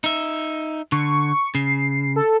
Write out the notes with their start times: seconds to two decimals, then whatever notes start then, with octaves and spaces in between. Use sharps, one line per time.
0.04 D#4 E5
0.92 D3 C#6
1.55 C#3 C7
2.16 A4